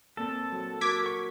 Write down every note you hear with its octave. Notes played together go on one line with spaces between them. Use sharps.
A#2 C4 A4
F#3
F#4 A#4 D6 G#6 B6
C#6